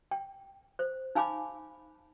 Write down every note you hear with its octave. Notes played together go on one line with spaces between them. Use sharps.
G5
C5
D#4 F5 G#5 B5 D6